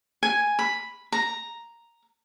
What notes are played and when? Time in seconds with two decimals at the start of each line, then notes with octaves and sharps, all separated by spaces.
0.23 G#5
0.59 B5
1.12 A#5